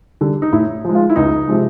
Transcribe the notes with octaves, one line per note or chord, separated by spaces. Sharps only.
D3 G3
D#4
A2 E4
F3 G#3
F4
E4
C#2 D#4
C3 F3 G#3